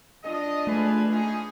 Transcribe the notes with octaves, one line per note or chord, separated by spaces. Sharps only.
D4 F4 D#5
A3 G#4 B4
C#4 D#4 G#4